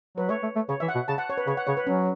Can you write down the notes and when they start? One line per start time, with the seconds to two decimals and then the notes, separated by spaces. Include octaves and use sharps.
0.17 F#3 B4
0.29 A3 C#5
0.43 A3
0.56 A3
0.69 C#3 C#5
0.80 E3 E5
0.88 F#5
0.95 B2
1.08 C#3 A5
1.18 F#5
1.30 C#5
1.37 B4
1.47 C#3 C#5
1.57 F#5
1.67 C#3 C#5
1.77 B4
1.87 F#3 C#4